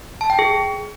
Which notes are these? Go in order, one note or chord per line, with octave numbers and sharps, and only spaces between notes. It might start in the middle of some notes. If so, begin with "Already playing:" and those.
A5
G5
G#4